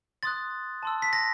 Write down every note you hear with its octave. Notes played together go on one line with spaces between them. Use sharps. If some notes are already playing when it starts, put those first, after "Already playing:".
C6 D#6 F#6 A6
A5 C6 E6
B6
A#6